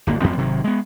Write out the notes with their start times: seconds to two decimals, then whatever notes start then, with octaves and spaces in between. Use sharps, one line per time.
0.07 D1 G1 A#3
0.21 A1 F2 F3 C4
0.37 G#1 C3 D#3 F#3
0.64 G#3 B3